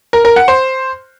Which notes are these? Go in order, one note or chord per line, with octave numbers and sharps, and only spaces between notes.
A#4
A#4
F#5
C5